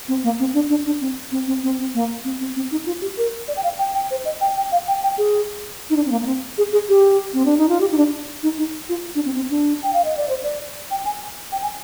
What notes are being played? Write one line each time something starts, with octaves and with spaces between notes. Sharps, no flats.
C4
A#3
C4
D4
D4
D4
C4
C4
C4
C4
C4
A#3
C4
C4
C4
D#4
F4
G4
A#4
D5
G5
F5
G5
G5
C5
D#5
G5
G5
F5
G5
G5
G#4
D#4
D4
C4
A#3
A#3
C4
G#4
G#4
G4
C4
D4
D#4
F4
G4
D#4
D4
D#4
D#4
F4
D4
C4
C4
D4
G5
F5
D#5
D5
C5
D5
G5
G#5
G5
G#5